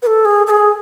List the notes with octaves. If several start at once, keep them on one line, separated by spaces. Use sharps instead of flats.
B4
A4
G#4
A4
G#4